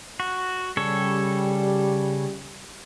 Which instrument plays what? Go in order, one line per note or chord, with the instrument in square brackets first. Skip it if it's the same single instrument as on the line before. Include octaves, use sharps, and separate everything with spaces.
[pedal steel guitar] F#4
[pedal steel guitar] C#3 A4 C#5 [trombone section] G3